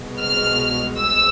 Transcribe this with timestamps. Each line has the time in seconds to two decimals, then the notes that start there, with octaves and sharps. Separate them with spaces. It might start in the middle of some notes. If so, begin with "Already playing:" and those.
Already playing: C2 B2 G#3
0.20 F6
0.99 E6